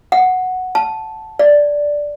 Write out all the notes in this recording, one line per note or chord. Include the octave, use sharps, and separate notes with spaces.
F#5
A5
D5